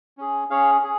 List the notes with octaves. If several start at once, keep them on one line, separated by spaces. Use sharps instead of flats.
C#4 G#4
C#4 G#4 C#5 F5
G#4